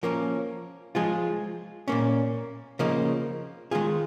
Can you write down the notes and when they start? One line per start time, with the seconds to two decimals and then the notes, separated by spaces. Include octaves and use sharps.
0.03 F3 A#3 C#4 A#4
0.95 F3 G#3 F4 G#4
1.88 A#2 A#3 C#4
2.79 C#3 F3 A#3 D#4
3.71 D#3 G#3 F4 G#4